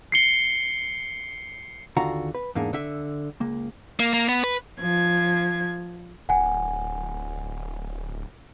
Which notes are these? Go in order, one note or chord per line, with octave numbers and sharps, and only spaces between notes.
C7 C#7 G7
D#2 D3 F4 F#4 A#5
B4
E2 G#2 A#3 D4 D#4
D3 E5
C#2 A#3
A#3
A#3
B3
B4
F3 G#6
D1 F#5 G#5